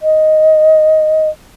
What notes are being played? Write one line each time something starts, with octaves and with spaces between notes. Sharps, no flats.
D#5